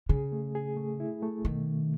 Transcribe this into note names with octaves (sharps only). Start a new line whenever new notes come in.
C#3 G#4
A3
G#4
A3
E4
A3
B2 D#3